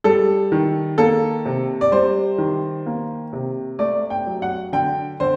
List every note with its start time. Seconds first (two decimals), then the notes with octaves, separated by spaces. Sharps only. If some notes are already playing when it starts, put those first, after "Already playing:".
0.04 G3 A4
0.52 D#3
0.98 A#3 A4
1.45 C3
1.81 D5
1.92 G3 C5
2.38 D#3
2.86 A#3
3.33 C3
3.79 A3 D5
4.10 G5
4.26 F#3
4.42 F#5
4.73 D3 G5
5.20 D3 C5